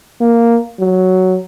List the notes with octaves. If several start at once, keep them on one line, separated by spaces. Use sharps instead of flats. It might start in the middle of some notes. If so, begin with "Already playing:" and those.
A#3
F#3